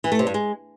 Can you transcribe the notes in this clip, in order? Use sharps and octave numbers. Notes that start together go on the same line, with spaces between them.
E3
A3
C3
G2
G#3